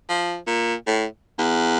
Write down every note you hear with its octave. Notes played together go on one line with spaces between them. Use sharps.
F3
A#2
A2
E2